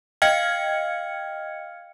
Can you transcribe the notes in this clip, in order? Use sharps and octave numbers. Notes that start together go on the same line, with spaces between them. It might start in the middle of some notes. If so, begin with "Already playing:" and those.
D#5 F5 G5 F6 G#6 C#7